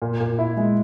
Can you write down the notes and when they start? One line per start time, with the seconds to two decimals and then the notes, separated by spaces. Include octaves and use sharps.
0.02 A#2
0.20 A#2
0.39 E4
0.57 G#3